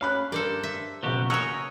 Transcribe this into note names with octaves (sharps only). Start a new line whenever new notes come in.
C#4 F5 B5 F#6
G2 A4 A#4 C5 D5
E5
F#1 B2 F3 F#4 G4
C#4 D#4 F#4 A#4 C#5 E6